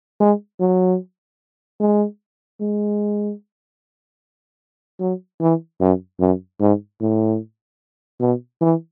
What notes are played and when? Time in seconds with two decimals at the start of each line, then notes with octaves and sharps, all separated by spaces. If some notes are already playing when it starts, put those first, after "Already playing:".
0.20 G#3
0.60 F#3
1.80 G#3
2.60 G#3
5.00 F#3
5.41 E3
5.80 F#2
6.20 F#2
6.60 G#2
7.01 A2
8.20 B2
8.61 E3